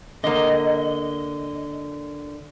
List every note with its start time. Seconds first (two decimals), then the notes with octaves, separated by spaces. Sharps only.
0.24 D3 A#3 D#5